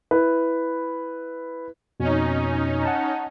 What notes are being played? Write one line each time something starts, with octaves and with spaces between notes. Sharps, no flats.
E4 B4
F2 B2 C#4 D#4
F#5 A5